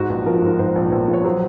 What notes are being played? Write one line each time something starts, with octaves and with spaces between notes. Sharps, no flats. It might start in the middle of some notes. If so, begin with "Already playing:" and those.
Already playing: G#2 F#4
A#1
F3 A#4
G#2
G#2 C5
A#1
A#1
F3
C#5
F#3 C5